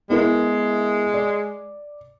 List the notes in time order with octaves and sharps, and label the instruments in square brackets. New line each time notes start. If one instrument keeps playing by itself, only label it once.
[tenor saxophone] G#3 [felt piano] B3 E4 A#4
[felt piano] D5